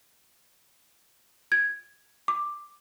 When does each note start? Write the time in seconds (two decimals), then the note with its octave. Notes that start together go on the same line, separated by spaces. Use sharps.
1.52 G#6
2.28 D6